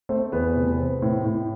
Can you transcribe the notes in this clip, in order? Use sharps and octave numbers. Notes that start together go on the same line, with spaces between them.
A3 C4 C5
E2 B3 B4
C3
C4
A2
A2